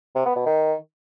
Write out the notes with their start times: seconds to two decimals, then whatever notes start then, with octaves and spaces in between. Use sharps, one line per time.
0.15 C3
0.26 B3
0.36 B2
0.46 D#3